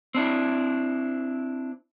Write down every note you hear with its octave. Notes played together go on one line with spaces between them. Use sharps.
C4 D4 E4